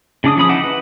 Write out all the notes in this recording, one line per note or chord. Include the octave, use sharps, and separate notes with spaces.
C#3 D4 D6 D#6
F3 C#4 B5 D#6
D#4 E4 F#5 D6
B4